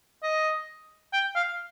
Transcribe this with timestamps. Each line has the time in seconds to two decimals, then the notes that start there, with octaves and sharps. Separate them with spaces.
0.23 D#5
1.13 G5
1.35 F5